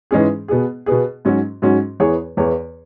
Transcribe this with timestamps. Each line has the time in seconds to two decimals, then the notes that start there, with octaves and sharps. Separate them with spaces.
0.11 G#2 E3 G#3 C#4 G#4
0.48 B2 B3 G#4
0.86 B2 B3 G#4
1.25 G#2 F#3 C#4 F#4
1.62 G#2 F#3 C#4 F#4
2.00 E2 E3 B3 G#4 C#5
2.37 E2 E3 B3 G#4 C#5